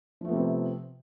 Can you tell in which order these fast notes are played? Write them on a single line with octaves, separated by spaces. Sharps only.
F3 A3 B3 C3 C4